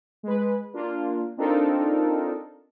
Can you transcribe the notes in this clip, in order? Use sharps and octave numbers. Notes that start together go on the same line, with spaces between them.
G#3 B4
A#3 D4 F4
C4 D4 D#4 F4 A4 A#4